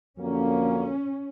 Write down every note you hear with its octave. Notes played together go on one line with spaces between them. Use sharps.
F2 D3 F#3 A#3 C#4